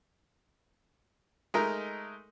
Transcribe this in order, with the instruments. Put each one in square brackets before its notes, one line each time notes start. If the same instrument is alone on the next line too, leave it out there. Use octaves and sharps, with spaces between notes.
[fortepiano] G#3 A3 D#4 A#4